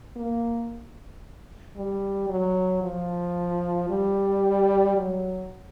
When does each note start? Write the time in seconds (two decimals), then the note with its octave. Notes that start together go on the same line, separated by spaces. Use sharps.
0.16 A#3
1.77 G3
2.30 F#3
2.83 F3
3.90 G3
4.97 F#3